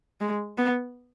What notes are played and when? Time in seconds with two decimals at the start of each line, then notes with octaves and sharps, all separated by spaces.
0.21 G#3
0.58 B3